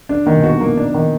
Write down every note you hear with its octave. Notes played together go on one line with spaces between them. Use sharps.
D3 D4
A#2 D#3
B2
D3 F#4
D#3
F3 A#3
D4
D#3